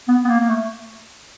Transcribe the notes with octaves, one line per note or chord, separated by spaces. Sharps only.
B3
B3
A#3
A#3
A3